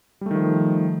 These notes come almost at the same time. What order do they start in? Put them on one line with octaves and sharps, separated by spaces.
G3 A3 D#3 F3